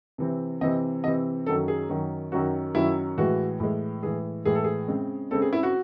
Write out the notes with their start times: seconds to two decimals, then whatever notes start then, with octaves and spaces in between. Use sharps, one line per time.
0.18 C3 E3 C4
0.61 C3 E3 C4 D#5
1.04 C3 E3 C4 D#5
1.46 F#2 D#3 F#3 C#4 A4
1.68 G#4
1.89 F#2 D#3 F#3 C#4
2.32 F#2 D#3 F#3 C#4 F#4
2.75 F#2 D#3 F#3 C#4 E4
3.17 A2 E3 G#3 F#4
3.60 A2 E3 G#3
4.03 A2 E3 G#3 G#4
4.45 A2 E3 G#3 G#4
4.55 A4
4.64 G#4
4.88 C#3 G#3 C4
5.31 C#3 G#3 C4 A4
5.42 G#4
5.53 E4
5.63 F#4